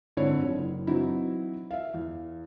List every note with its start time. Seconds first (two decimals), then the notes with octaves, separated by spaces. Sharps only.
0.17 G#2 D3 C4 E4 C#5
0.43 F#1
0.87 E3 F#3 C4 D#4 E4
1.71 E5 F5
1.94 E2